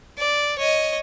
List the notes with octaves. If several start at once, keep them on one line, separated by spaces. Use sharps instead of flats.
D5
C#5 D#5